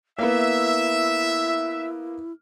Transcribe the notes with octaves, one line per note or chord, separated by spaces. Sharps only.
A#3 B3 E4 E5